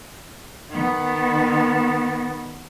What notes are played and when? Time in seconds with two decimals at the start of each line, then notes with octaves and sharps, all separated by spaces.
0.71 D#3 B3